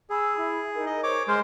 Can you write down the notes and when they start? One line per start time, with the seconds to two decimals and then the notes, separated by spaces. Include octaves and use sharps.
0.10 G#4 B5 E6
0.36 E4 E5
0.73 D#4 A#4
0.86 D#5
1.03 C5 C#5 D6
1.28 G#3 A#4 C5 C6 F6